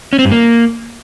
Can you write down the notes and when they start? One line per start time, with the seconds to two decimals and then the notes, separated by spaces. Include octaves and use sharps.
0.13 C#4
0.19 C4
0.25 G2
0.31 A#3